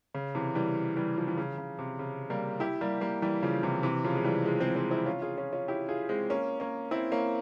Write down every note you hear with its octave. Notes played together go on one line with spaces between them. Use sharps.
C#3
C3 E3
E3 G3
E3 G3
F3
E3
C#3
C#3
C3
C#3
G3 A#3
E4 G4
G3 A#3
G3 A#3
E3 G3
C#3 F3
C3 E3
C3 E3
C#3 F3
G#3
E3 G3
F3 G#3
G#3 C4
G#3 C4
C4 E4
C#4 F4
F4 G#4
C#4 F4
C#4 F4
E4 G4
F4 G#4
G#3 C4
A#3 C#4
A#3 C#4
C4 E4
A#3 C#4